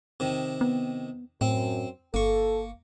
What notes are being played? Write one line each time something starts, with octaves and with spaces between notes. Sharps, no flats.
C3 D#3
B3
F#2 A2 C4
G1 A#3 A4 C#6